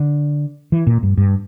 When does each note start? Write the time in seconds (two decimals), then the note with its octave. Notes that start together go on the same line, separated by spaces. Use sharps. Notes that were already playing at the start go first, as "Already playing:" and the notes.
Already playing: D3
0.72 E3
0.87 A#2
1.03 G2
1.18 G2